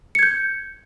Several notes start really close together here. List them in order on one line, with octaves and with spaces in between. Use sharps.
C#7 G#6 G6